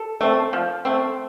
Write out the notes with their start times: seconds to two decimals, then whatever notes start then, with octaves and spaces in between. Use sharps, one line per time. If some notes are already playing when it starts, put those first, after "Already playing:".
Already playing: A4
0.21 A3 C4
0.53 F3
0.85 A3 C4